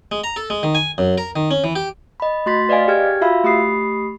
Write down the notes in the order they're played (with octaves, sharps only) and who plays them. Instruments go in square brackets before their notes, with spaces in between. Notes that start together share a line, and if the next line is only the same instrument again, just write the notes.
[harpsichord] G#3
A#5
A4
G#3
D#3
G#5
F#2
A#4
D#3
C#4
E3
G4
[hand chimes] D#5 B5
A3 F#4 C6 A6 B6
B4 D5 D#5 F5 G#5
G4 G#4 G5 F6 G#6
F4 F#4 E5 F5 B5 E6
A3 G4 B5 D#6 C7